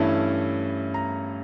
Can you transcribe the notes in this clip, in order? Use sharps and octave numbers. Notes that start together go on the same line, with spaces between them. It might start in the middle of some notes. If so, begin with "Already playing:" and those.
Already playing: G2 E3 A3 C#4 E4 A5
A#5